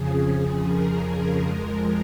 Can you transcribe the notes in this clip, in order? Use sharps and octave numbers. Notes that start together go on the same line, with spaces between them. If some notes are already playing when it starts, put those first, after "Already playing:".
Already playing: F2 C#3 F3 G#4
A#4
F2 F3 G#3